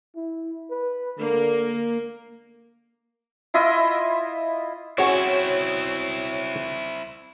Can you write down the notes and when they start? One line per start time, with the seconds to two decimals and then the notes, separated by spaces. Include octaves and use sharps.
0.16 E4
0.71 B4
1.19 D3 A#3
3.54 E4 F4 D#5 E5
4.98 C4 C#4 E4 F#4 G#4 C#5